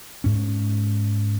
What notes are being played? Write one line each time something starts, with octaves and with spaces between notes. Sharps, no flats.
G#2 C#4